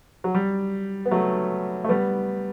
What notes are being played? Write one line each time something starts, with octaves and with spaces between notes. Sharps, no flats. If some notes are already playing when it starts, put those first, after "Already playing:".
F#3
G3
B3
F#3 A3
A3
G3 B3